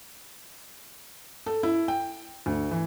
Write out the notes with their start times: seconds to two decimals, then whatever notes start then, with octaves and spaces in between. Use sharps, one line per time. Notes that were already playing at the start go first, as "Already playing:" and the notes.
1.46 A4
1.63 E4
1.88 G5
2.46 D2
2.71 E3